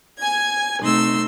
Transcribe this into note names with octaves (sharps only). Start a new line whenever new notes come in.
G#5 G#6
C3 A3 D#4 C6 E6